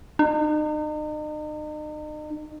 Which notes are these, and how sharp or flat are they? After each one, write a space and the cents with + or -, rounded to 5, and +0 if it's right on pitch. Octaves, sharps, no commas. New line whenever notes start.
D#4 -40